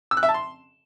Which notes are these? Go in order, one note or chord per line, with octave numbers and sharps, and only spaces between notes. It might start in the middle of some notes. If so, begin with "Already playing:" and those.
E6
F#6
E5
A5
C6